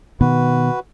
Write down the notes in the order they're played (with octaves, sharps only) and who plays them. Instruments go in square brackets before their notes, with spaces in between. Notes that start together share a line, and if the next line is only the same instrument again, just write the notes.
[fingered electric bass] B2 D#3 B3 [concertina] F#4 B4